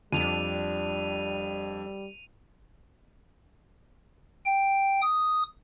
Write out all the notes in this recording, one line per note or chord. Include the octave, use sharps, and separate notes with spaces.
F2 G3 D4 D#7 F7
G5
D#6